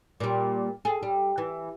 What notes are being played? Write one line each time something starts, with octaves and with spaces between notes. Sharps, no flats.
A#2 G3
G#4 A4
G3
E3